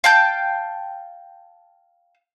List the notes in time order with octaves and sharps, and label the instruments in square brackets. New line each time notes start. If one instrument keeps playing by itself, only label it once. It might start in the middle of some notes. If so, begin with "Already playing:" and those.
[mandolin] F5 G5 A5 G6